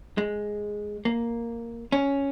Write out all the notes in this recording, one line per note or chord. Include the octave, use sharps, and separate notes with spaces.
G#3
A#3
C#4